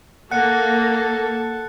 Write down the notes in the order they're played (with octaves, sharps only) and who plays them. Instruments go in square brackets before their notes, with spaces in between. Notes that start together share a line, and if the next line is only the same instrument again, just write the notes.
[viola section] A#3 [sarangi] A4 [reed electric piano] F#5 [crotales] F#6 C#7